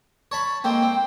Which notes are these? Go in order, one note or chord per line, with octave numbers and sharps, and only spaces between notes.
C#5 A5 B5
G#3 A#3 C4 G5
C4